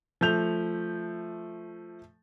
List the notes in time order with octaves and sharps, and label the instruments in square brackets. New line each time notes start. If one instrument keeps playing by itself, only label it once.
[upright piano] F3 A3 G6 F7